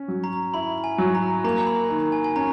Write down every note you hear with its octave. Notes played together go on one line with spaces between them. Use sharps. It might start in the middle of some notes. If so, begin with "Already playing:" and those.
Already playing: C#4
F#3
A#5
E4 B5
G#5
F#3
A#5
A#3 A#5
B5
D#3
G#5
G#5
C#4 A#5